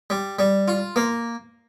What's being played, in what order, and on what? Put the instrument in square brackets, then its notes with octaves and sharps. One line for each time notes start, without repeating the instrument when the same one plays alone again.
[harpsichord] G3
G3
F4
A#3